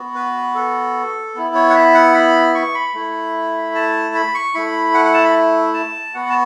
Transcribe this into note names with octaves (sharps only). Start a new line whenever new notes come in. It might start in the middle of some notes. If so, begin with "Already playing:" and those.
Already playing: B3 F#4
B4
A4
B3 E4
C#5
F#5
E5
F#5
B5
C#6
B5
A3 E4
A5
B5
C#6
A3 E4 B5
F#5
F#5
A5
B5
A5
B3 F#4 F#5
A5